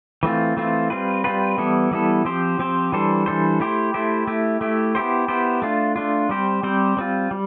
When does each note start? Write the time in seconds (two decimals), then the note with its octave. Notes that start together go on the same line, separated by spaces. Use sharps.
0.23 E3 A3 C4 F4
0.57 E3 A3 C4 F4
0.90 G3 C4 F4 B4
1.24 G3 C4 F4 B4
1.58 E3 G3 B3 E4 A4
1.91 E3 G3 B3 E4 A4
2.25 F3 C4 G4 C5
2.59 F3 C4 G4 C5
2.92 E3 G3 D4 A4 C5
3.26 E3 G3 D4 A4 C5
3.60 A3 E4 G4 C5
3.94 A3 E4 G4 C5
4.27 A3 E4 G4
4.61 A3 E4 G4
4.95 B3 E4 G4 C5
5.28 B3 E4 G4 C5
5.62 A3 D4 F4
5.96 A3 D4 F4
6.29 G3 C4 G4 C5
6.63 G3 C4 G4 C5
6.97 G3 C4 F4
7.31 G3